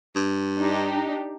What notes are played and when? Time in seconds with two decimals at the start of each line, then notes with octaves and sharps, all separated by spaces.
0.16 G2
0.59 D4 D#4 G4